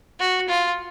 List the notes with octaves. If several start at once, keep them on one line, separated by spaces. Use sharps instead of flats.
F#4
F4